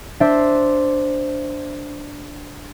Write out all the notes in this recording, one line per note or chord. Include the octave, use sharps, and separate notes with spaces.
D4 C5 E5